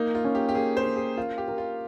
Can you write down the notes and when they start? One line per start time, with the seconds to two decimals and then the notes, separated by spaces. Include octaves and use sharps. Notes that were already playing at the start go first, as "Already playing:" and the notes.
Already playing: A#3 D#4
0.15 F4
0.25 C#4
0.35 G4
0.49 G4
0.55 A#3 G#4
0.77 C5
0.86 C#4
0.96 G#4
1.17 F4 A#4
1.38 G4
1.48 A#4
1.58 F4